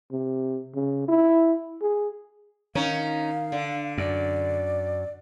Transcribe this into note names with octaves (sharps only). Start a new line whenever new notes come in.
C3
C#3
E4
G#4
D#3 C#4 D#4 F5
D3
F#2 D5